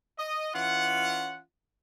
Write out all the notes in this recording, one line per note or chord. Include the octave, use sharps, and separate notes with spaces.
D#5
E3 C#4 F4 F#5